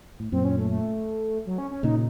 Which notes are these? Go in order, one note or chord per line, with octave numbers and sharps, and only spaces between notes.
A2
F#2 A#2 C4
C#4
A3
A3
F#3
C#4
C#4
A#2 C#3 D#4